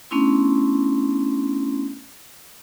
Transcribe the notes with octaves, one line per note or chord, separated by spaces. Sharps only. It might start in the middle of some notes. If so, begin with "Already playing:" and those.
A3 B3 C#4 D4 E4 C6